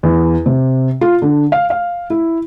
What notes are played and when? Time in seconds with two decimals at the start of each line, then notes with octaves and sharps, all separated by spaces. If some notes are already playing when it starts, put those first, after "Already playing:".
0.03 E2
0.46 C3
1.01 F4
1.22 D3
1.52 F5
1.70 F5
2.10 E4